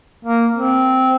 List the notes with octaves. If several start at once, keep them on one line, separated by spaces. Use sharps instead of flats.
A#3
C4